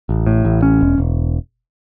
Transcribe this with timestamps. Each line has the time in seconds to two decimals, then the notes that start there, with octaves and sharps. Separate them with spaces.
0.09 A1
0.26 A2
0.45 A1
0.62 C#4
0.81 E1
0.98 E1